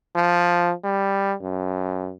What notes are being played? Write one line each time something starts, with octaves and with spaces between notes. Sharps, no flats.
F3
G3
F#2